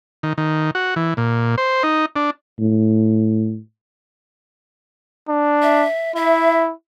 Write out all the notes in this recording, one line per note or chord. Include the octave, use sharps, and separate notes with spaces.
D#3
D#3
F#4
E3
A#2
C5
D#4
D4
A2
D4
E5
E4 E5